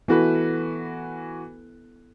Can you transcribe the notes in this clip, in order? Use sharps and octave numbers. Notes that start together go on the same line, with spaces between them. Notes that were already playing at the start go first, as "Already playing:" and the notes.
E3 B3 E4 F#4 A4 B4